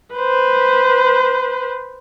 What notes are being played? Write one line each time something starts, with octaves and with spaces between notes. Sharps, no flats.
B4 C5